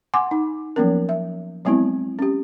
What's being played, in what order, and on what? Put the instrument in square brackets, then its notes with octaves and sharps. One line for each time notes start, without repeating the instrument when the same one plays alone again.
[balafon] F#5 G#5 C6 D6
D#4
F3 F#3 A#3 B3 C#4 A#4
E5
F#3 G#3 B3 C4 E4
C#4 G4